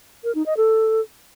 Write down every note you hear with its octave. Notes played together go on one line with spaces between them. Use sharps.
A#4
D#4
D#5
A4